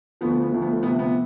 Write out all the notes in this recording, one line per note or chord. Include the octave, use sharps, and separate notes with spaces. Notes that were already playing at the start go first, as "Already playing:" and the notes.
D2 D3 F3 B3
B3
B3
D2 D3 F3 A3
B3
A3
D2 C3 F3 B3
B3